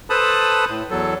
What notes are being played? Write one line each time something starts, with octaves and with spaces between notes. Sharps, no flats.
A4 B4 C5 A5 B5 D#6
A2
E2 F#3 A4